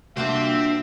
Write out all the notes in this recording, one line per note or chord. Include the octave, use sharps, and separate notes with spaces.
C2 A#3 C4 D4 F4 F#4 C5 E5